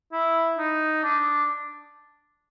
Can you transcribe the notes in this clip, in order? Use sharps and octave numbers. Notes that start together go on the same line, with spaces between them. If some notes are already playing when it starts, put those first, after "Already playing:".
E4
D#4
D4